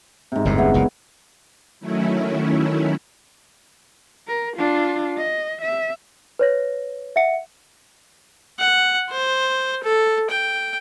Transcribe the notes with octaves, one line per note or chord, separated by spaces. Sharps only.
G#2 C3
G1 E2 A2
C#3 B3 E4
F#1 C#2 A#2
D#3 F#3 A3 C#4 E4
A#4
D4 F4
D#5
E5
B4 C#5 A#6
E5 F#5 C#7
F#5
C5
A4
G5